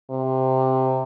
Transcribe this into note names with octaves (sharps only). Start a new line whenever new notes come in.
C3